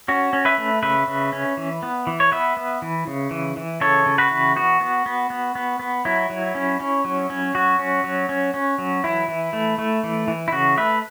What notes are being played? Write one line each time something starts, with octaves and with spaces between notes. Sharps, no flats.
C#4 F#4
C#4
B4 E5
A3
C#3 B4 E5
C#3
C#4
E3
B3
E3
C#5
B3 B4 E5
B3
E3
C#3
E3
E3
C#3 A4 C#5
C#3
F#4 B4
E3
B3 F#4
B3
B3
B3
B3
B3
F#3 E4
F#3
C#4
C#4
F#3
C#4
F#3 F#4
C#4
F#3
C#4
C#4
F#3
E3 E4
E3
A3
A3
E3
E3
E4
C#3 F#4
A3 B4 E5